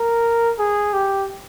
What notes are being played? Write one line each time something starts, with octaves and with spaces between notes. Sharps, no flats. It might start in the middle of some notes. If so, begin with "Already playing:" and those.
Already playing: A#4
G#4
G4